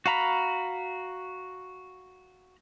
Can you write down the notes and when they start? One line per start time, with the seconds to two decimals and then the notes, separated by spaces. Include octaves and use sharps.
0.06 F#4 F5 A#5 B5